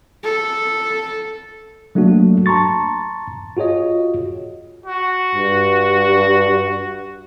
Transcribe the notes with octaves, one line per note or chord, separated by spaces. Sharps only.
A4
F#3 A3 A#3 D4 F#4
A5 A#5 C6 C#6 A6
F4 F#4 G#4 C#5 D#5
F#4
G2